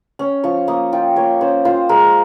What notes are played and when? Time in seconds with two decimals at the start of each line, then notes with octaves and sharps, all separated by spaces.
0.19 C#4
0.44 F3 C#6
0.68 A#3 D#6
0.92 F4 G5
1.16 A#3 C#5
1.41 C#4 C5
1.65 F4 C5
1.89 G#3 A#4